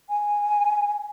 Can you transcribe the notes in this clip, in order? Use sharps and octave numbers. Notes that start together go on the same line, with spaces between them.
G#5